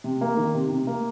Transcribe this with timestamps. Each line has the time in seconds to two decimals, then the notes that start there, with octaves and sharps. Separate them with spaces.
0.04 C3
0.21 A#3
0.37 D#3
0.54 C3
0.70 C3
0.87 A#3